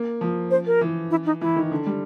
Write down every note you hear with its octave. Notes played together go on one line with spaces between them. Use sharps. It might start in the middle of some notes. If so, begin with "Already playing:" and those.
Already playing: A#3
F3
C5
A#4
E3
E4
D#4
E3 E4
D#3
D3
G3